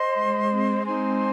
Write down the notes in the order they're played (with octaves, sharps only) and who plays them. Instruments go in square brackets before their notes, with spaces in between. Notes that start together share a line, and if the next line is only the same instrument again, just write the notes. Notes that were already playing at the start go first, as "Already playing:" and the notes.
Already playing: [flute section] C5 D#5 C6
[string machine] G#3
G#3 C4
[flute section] D#4 C5 G#5 C6